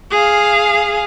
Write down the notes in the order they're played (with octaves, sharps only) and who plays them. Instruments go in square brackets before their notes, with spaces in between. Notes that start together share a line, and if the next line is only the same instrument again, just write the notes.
[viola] G#4 F5